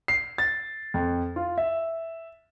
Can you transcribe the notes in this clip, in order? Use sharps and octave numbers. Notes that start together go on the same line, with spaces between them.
C7
A6
F2
F4
E5